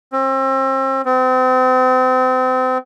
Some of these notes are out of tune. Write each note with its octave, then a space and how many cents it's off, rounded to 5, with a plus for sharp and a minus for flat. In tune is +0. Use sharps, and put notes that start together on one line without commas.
C4 +35
C4 -35